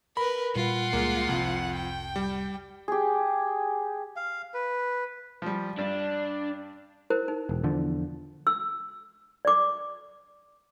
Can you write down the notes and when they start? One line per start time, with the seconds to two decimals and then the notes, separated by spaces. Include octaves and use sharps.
0.17 A#4 B4 B5
0.56 A#2 G3 F4 F#5
0.93 C#2 G3 G#3 A#3
1.29 F1 C2 F2 C3
1.76 G5
2.16 G3
2.88 G4 G#4
4.16 F5
4.54 B4
5.42 F3 G3
5.78 G2 D4
7.10 E4 A#4 C5
7.28 D#4
7.49 E1
7.64 E2 D3 F3
8.47 E6
9.45 D5 D6